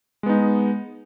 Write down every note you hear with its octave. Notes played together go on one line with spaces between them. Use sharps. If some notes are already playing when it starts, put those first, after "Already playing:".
G#3 B3 D#4